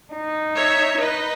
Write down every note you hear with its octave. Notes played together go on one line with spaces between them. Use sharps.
D#4
C#5 E5
D#4 B4 D#5